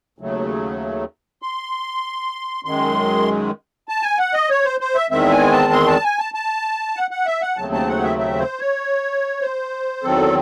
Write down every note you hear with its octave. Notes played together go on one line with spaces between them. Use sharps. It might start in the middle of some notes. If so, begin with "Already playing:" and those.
D#2 C#3 F#3 A3
C6
F#2 D#3 G#3 C6
A5
G#5
F#5
D#5
C#5
C5
C5
E5
E2 D#3 G#3 C4 E5
G#5
A5
C6
A5
G#5
A5
A5
F#5
F#5
E5
F#5
D#2 C#3 F#3 A3 C4 A5
A5
F#5
E5
E5
C5
C#5
C5
E2 D#3 F#3 C4 A4